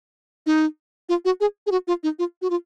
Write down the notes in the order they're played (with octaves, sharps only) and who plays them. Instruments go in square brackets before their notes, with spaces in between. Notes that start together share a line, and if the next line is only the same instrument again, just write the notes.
[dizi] D#4
F4
F#4
G#4
G#4
F#4
F4
D#4
F4
F#4
F4